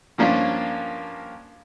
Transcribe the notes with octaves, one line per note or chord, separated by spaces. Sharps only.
G2 F3 A#3 C#4 D4 F4